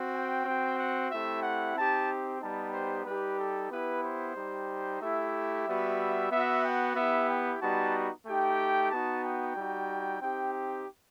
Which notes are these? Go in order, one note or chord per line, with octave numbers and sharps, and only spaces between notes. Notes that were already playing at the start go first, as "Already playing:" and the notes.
Already playing: C4 F#4
G5
C4 F#4
F#5
A3 C4 E4 G4 E5
F#5
C4 D#4 G4 A5
G3 B3 D#4 G4 A5
C5
G3 D#4 G4 B4
A4
B3 E4 G4 B4
C5
G3 D#4 G4
A3 E4 G4 E5
G3 B3 F#4
B3 F#4 E5
G5
B3 E4 G4 E5
G5
G3 B3 D#4 F#4 A5
A3 D#4 G4 G5
B3 D#4 F#4 A5
G5
G3 D#4 F#4
C4 D#4 G4 G5
G5